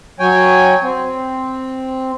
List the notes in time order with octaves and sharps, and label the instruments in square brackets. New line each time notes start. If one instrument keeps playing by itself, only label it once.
[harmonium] F#3 C#5 G5 G#5
C4